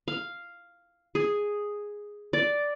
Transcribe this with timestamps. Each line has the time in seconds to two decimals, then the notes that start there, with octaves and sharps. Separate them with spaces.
0.08 F5
1.15 G#4
2.33 D5